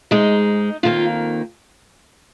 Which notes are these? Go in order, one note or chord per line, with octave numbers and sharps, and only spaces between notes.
G#2 G#3 D#4
F2 D#3 A#3 F4